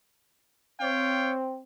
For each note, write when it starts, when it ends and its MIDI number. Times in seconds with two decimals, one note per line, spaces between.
0.81 1.62 60
0.81 1.34 73
0.81 1.34 77
0.81 1.34 79